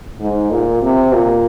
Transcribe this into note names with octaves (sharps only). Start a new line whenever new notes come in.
G#2
A#2
C3
A#2